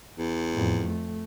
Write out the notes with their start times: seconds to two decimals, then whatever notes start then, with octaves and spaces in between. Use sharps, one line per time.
0.18 E2
0.53 F2 A2
0.86 A3